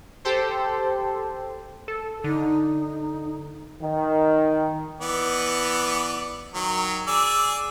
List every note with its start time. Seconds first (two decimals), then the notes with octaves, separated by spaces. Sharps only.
0.25 G4 A4 C5
1.88 A4
2.24 D3 D#4
3.81 D#3
5.01 E3 B3 D5
6.54 D#3 F#3
7.07 G#4 D5 E6